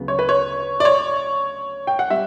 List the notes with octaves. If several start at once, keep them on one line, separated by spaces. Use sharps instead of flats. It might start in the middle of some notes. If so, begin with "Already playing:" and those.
Already playing: D2 C#3 F#3 B3
C#5
B4
C#5
D5
C#5
G5
F#5
G3 E5